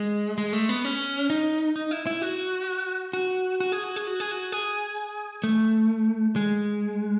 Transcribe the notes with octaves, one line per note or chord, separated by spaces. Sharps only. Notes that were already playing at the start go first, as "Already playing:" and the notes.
Already playing: G#3
G#3
A3
B3
C#4
D#4
D#4
E4
E4
F#4
F#4
F#4
G#4
F#4
G#4
F#4
G#4
F#4
G#4
A3
G#3